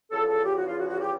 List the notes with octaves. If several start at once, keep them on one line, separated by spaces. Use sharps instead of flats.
E2 C#3 F3 A4
A4
G4
F#4
F4
F#4
F#4
G4